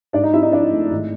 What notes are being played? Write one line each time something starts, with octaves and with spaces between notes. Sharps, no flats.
G#2 D4 D5
D#4 D#5
C4 E4 E5
D#4 D#5
F3 D4 D5
A3
G#1